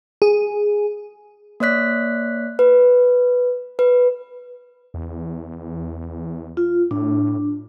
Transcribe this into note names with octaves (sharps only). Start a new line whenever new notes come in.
G#4
A#3 C#5 D5 F#6 B6
B4
B4
E2
F4
A2 D4